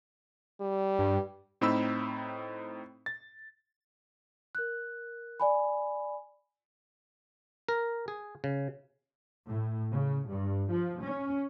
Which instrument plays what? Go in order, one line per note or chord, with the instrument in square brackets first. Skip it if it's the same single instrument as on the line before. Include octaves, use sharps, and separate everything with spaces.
[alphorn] G3
[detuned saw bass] G2
[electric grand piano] A2 C4 D#4 B5 E6
A6
[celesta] A#4 F#6
D5 G#5 B5
[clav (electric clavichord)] A#4
G#4
C#3
[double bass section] A2
C#3
G2
F3
C#4